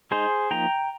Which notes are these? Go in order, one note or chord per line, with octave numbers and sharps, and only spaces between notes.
G#3 D#4 G#4 C5
F3 A#3 D#4 G5 A#5